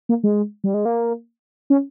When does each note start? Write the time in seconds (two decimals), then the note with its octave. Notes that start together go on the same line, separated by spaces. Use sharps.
0.09 A#3
0.24 G#3
0.64 G3
0.74 G#3
0.85 A#3
1.70 C#4